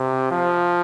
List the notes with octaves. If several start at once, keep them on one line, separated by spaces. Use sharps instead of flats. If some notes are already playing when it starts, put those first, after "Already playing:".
Already playing: C3
F3